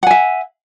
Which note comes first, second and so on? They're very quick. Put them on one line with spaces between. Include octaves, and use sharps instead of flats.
F#5 G#5 E5